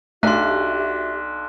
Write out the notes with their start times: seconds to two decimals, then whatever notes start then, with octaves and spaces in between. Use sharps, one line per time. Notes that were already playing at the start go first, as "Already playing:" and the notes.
0.23 B1 A3 D4 F#4 G4 E5 C6 F#6